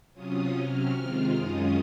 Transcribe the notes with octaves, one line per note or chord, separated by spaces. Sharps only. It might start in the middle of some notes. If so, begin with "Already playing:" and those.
C3 F#3 C#4 F4 D#6
C3 F#3 C#4 F6
C3 D#3 G#3 C4 F4
F#2 D#3 G#3 C#4 F4 D#6